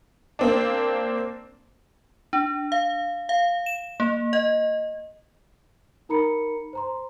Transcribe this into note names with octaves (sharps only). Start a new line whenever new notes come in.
A#3 C4 D4
D4
F5
F5
E7
A#3
D#5
D#4 A#4 A#5 B5 C#7
C5 A#5 C6